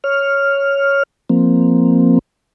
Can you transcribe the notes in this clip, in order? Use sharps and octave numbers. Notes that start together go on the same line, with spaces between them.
C#5 F6
F3 A#3 C4